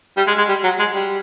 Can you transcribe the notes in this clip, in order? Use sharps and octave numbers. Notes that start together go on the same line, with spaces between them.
G3
G#3
G#3
G3
F#3
G#3
G3